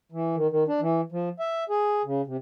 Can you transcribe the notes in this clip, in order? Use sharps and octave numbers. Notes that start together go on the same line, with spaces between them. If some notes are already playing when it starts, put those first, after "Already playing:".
E3
D#3
D#3
D4
E3
F3
E5
G#4
C#3
C3